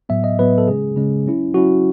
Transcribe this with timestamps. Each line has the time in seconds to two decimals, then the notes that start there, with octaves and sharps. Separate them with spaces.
0.09 A2 F#3 B3 E5
0.24 D#5
0.39 A2 F#3 B3 B4
0.58 A4
0.68 C#3 G#3 C#4 G#4
0.96 C#3 G#3 C#4
1.26 F#3 C#4 E4
1.54 F#3 C#4 E4 F#4